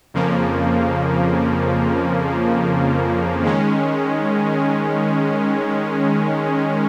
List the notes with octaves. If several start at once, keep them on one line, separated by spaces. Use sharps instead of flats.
F2 C#3 F3 A#3
D#3 G#3 C#4